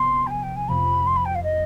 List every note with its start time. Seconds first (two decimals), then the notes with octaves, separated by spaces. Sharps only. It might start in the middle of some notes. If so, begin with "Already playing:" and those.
Already playing: C3 F3 B3 C6
0.26 G5
0.30 G#5
0.43 G5
0.56 G#5
0.68 F2 C3 F3 B5
1.06 C6
1.16 B5
1.25 G5
1.35 F5
1.43 D#5